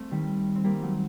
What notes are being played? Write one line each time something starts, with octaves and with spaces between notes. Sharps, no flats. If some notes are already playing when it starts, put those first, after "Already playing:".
Already playing: A3 C4
D#3 G3
C4
G3 A#3
F#3 A3